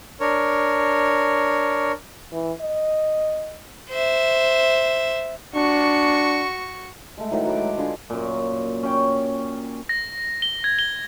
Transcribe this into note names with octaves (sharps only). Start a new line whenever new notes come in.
D4 A#4 C#5
E3
D#5
C5 E5
D4 F#4 C#6
G#3 A3
A2 D#3 E3 F#3
F#4 B5 D6
G#3
D3 F4 G#4 D6
F#2 A#2
C#4 G5
A#6
G7
G#6
G7